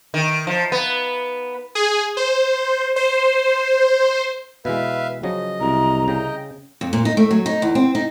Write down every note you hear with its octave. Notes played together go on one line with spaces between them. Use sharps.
D#3
F3
B3
G#4
C5
C5
B2 E3 G#3 B4 E5 F5
C#3 F3 F#3 D#5
C2 A#5
C#3 D#5 G5
F2
A#2
D#4
A3
F#3
D#4
E2
C4
D#4